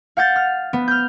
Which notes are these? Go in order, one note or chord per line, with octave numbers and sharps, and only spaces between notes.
F5 F#5 G6 A6
F6
B3
F6 G6